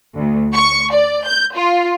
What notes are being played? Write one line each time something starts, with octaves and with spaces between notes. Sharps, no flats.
D2
C#6
D5
G6
F4